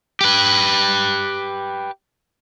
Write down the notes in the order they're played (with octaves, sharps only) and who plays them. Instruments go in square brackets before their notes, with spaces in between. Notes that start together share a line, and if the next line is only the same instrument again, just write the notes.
[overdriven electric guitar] G4 B4